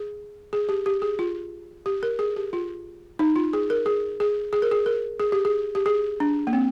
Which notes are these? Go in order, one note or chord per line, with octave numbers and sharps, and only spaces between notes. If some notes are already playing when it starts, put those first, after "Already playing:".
Already playing: G#4
G#4
G4
G4
G#4
F4
G4
A#4
G#4
G4
F4
D#4
F4
G#4
A#4
G#4
G#4
G#4
A#4
G#4
A#4
G#4
G4
G#4
G4
G#4
D4
A#3
C4